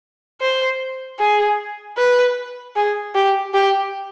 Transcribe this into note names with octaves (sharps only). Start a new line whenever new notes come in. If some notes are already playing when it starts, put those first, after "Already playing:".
C5
G#4
B4
G#4
G4
G4